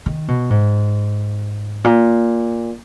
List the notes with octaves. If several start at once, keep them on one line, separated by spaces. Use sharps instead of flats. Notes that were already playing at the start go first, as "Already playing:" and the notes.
D#3
B2
G#2
A#2